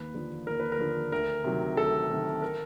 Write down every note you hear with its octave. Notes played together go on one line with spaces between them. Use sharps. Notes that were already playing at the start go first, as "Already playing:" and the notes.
Already playing: D#2 B4
D3 F3
D#2 A#4
B4
A#4
D3 F3
D2 A#4
C3 D#3 F#3
D2 A4
C3 D#3 F#3
A#4